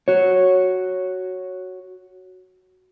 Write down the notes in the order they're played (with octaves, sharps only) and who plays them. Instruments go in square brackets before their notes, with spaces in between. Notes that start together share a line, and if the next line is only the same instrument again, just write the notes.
[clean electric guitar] F#4 C#5